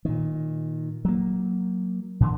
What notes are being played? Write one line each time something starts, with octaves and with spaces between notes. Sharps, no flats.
A#2 D#3
F#3 A#3
A#2 D3 E3